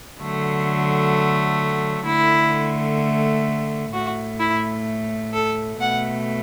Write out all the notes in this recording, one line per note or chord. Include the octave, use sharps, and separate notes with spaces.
D3 F#3 A3
D3 A3 E4
A2 A3 F#4
E4
A4
B2 A3 F#5